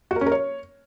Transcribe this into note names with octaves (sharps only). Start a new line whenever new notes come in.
F#4
A#4
C#4
A#4
C#5